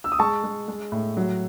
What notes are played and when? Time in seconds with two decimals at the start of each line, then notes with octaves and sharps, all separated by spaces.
0.04 E6
0.12 D#6
0.19 G#3 A5 C#6
0.44 G#3
0.68 G#3
0.92 A2
1.17 F#3